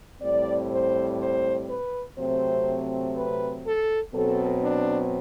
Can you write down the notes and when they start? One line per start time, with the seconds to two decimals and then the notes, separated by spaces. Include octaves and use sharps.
0.21 A2 G3 C4 D5
0.71 C5
1.20 C5
1.68 B4
2.17 C3 F#3 A3 C4 C5
3.15 B4
3.64 A4
4.13 B2 F#3 C4 A4
4.62 D4